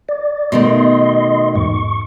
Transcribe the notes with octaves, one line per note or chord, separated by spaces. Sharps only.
D5
B2 D#3 A3 D#5 C6
E2 G#2 C#6